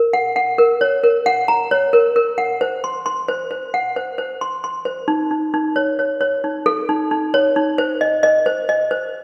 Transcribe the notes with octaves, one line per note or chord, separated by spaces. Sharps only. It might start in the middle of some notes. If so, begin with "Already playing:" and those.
Already playing: A#4
F#5
F#5
A#4
C#5
A#4
F#5
A#5
C#5
A#4
A#4
F#5
C5
C6
C6
C5
C5
F#5
C5
C5
C6
C6
C5
D#4
D#4
D#4
C#5
C#5
C#5
D#4
A4
D#4
D#4
C#5
D#4
C5
D#5
D#5
C5
D#5
C5